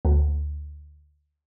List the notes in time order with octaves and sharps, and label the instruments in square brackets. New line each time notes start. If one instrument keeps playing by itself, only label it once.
[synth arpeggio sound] D2